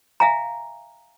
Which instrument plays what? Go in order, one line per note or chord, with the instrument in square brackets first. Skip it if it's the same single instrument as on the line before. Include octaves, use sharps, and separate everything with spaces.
[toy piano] E5 F5 G#5 A#5